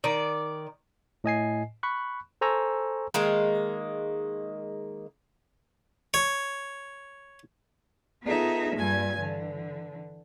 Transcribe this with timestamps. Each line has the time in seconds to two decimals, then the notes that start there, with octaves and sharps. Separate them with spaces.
0.04 D#3 D5
1.24 A2 D#5 G#5 C7
1.83 B5 C#6 F#6
2.41 A4 C5 G#5 A#5 C#6 E6
3.14 D#3 G#3 A#3
6.14 C#5
8.23 B3 D#4 F4 G#4 A4 E5
8.75 G2 A#2 G3 G#5 G#6
9.18 D3 E3